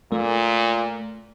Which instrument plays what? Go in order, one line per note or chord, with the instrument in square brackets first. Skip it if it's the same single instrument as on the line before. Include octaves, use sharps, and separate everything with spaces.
[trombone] A#2 [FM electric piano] A3